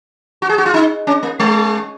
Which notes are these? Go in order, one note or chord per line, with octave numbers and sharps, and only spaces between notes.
F#4
G#4
F#4
F4
D#4
C#4
A#3
G#3